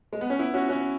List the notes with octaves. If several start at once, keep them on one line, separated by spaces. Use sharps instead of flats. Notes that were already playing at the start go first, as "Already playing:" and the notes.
G#3
B3
C#4
B3 E4
C#4 F#4
C#4 F#4